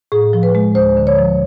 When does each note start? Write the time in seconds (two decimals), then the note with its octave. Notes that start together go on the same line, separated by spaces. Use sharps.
0.12 A2 G#4
0.33 F3
0.43 B4
0.55 G#3
0.75 D2 C5
0.97 D3
1.07 C#5
1.18 F3